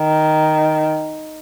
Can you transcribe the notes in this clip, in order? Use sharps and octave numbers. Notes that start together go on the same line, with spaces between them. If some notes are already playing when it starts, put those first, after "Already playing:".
Already playing: D#3